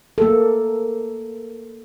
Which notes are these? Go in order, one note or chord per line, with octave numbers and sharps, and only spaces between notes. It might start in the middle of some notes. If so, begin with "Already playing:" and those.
A#3 A4